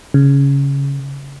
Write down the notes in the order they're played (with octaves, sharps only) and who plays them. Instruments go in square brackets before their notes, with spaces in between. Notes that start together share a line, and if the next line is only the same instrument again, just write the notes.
[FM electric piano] C#3